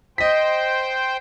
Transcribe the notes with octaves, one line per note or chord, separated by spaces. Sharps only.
C5 D#5 G5 B6